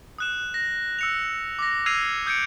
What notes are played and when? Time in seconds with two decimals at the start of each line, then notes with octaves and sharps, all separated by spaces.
0.18 D#6 F#6 E7
0.54 A#6
0.99 E6 C#7 F7
1.59 D6 A#6
1.86 E6 F6 G#6 C7 D#7 F7
2.26 D#6 G6 G#6 C#7 D7